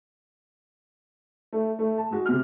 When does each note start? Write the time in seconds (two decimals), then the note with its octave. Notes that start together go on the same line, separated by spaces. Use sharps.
1.53 A3
1.79 A3
1.98 A5
2.11 G#3 F#4
2.26 C3 F6